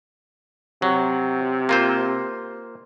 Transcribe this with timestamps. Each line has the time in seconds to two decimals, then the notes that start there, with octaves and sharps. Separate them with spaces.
0.82 C3 F#3
1.69 A#3 F4 C5